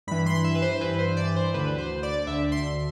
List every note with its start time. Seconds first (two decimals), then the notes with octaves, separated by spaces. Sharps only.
0.07 G2 E3 B5
0.26 C6
0.44 E5
0.55 B4
0.62 C5
0.81 G2 E3 B4
0.99 C5
1.17 D5
1.36 C5
1.54 D2 D3 B4
1.78 C5
2.03 D5
2.27 D2 D3 E5
2.52 C6